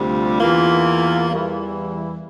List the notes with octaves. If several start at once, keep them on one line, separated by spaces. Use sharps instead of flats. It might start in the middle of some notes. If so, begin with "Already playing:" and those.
Already playing: D2 C3 G3 D4 F4
E2 E3 A#3 F4
E2 E3 G3